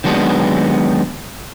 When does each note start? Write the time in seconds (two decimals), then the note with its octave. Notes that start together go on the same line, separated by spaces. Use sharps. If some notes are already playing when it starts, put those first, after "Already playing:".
0.04 D#3 F#3 G#3 B3 D4